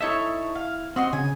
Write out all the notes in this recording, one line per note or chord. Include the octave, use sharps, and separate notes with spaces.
D#4 E4 A4 C#5 E5
F5
C4 F#4 D#5 C6
C#3 G#5